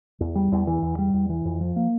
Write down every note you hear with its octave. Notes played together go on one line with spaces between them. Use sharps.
E2
G3
E2
E3
E2
G3
E2
E3
F2
F3
A#3